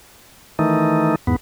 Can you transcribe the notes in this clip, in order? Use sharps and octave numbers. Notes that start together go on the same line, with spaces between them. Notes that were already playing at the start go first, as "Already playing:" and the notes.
D#3 E3 A3 D#4
E2 G#2 B3